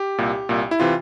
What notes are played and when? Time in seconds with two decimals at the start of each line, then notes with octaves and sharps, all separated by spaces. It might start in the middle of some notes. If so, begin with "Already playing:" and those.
Already playing: G4
0.18 C2 A#2
0.49 C2 A#2
0.71 E4
0.80 C3 E3 F4